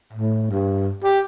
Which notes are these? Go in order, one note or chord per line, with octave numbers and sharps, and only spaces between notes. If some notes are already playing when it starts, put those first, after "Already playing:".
A2
G2
G4